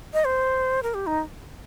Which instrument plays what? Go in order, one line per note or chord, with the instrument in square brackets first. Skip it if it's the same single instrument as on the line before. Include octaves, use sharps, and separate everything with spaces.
[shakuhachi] D#5
C5
A#4
G4
D#4